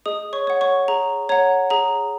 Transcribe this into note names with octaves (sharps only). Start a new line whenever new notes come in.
G#4 D#5 D#6
C#5 C#6
C#5 F#5
C#5 C#6
G#4 A#5
C#5 F#5 A#5
G#4 A#5